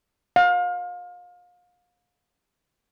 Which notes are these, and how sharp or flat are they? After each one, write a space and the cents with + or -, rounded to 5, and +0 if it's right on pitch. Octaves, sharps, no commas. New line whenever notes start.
F5 +30